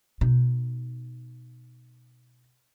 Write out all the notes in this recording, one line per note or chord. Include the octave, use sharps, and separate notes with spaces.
B2 D#4